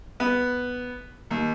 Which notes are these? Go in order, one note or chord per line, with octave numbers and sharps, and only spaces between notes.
B3
D#2